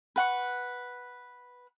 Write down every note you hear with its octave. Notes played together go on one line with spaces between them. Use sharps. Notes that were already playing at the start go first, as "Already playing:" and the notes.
B4 F#5 C#6